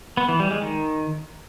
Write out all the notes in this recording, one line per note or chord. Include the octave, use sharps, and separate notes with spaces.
B3
E3
G3
G#3
D#3